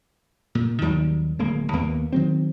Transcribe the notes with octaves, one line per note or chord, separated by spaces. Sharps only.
A#2
D#2 D#3 F#3 G3
D1 G#3 A#3
D#2 A#3 B3
D#3 F#3 C4